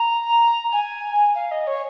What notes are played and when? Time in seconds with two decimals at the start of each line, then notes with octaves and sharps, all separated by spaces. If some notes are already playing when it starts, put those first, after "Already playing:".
Already playing: A#5
0.72 G#5
1.35 F5
1.51 D#5
1.67 C#5